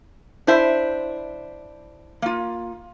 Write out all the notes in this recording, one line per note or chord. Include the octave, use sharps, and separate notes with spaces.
D4 E4 C5 E5
A#3 F4